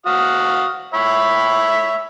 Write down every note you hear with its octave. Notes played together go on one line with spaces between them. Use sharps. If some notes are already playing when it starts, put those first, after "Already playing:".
F#4 F5 D#6
C#5 E5 B5